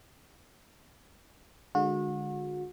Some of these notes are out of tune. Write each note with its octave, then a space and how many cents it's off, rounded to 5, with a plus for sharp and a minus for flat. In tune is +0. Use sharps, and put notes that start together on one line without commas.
D3 +15 G#3 -5 F#4 -35